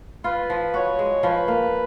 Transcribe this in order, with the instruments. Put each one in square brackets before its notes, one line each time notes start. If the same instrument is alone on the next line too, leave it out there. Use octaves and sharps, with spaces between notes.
[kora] F4 [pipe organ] B4
[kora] F3
[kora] F#4 [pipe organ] C#5
[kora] G#3
[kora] F3 [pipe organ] B4
[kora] A#3